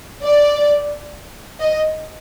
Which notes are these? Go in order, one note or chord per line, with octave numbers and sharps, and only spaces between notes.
D5
D#5